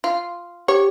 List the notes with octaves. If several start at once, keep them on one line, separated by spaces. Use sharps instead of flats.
F4
G4 C#5